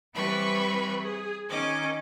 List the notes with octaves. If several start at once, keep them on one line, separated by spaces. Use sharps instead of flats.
E3 G3 C4 B4 B5 C#6
G#4
D#3 C#4 D#5 D6